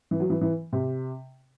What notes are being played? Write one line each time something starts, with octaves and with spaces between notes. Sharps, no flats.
E3
F#3
E3
E3
C3